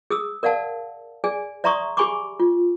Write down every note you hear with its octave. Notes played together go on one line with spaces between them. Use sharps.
G#4 D#6 E6
A#4 D5 F5 F#5 A5
G#4 D5 G#5
D5 E5 A#5 C6 C#6 D#6
G4 G#4 G#5 B5 C#6 D6
F4